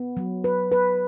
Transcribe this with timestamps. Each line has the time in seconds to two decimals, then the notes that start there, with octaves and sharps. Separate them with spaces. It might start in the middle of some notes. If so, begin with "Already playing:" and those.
Already playing: B3
0.17 F#3
0.44 B4
0.72 B4